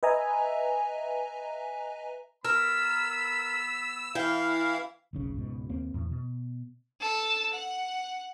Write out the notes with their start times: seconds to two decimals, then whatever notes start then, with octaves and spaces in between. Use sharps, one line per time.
0.03 B4 D#5 E5 G#5 A#5
2.45 B3 A#4 B5 E6
4.15 E3 E4 F5 G5
5.13 F1 B1 C#3
5.34 C#2 G#2 B2
5.69 D#2 A#3 C4
5.94 E2 A2
6.11 B2
7.01 A4 A5
7.53 F#5